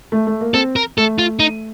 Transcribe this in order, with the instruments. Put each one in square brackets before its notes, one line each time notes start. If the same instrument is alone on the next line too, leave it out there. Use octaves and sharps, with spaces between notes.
[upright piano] A3
A3
A#3
[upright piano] C4 [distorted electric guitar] A4
[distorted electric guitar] A#4
[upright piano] A3 [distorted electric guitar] A4
[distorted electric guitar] F4
D#4